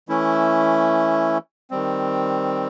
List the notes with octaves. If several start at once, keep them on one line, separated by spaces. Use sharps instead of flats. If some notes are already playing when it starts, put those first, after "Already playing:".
E3 A3 C#4 E4
D#3 G3 C4